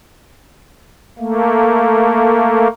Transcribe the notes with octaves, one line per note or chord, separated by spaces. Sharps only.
A3 A#3